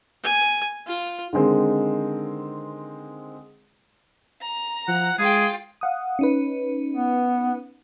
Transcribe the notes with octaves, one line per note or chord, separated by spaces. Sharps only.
G#5
F4
D3 D#3 G#3 C4 G#4
A#5
F3 F#5
G#3 F4 G#4 G5
F5 F#5 D#6
C#4 D#4 B4
B3